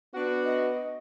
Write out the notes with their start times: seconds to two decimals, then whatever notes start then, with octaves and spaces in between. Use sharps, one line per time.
0.14 B3 D4 F#4
0.45 D#5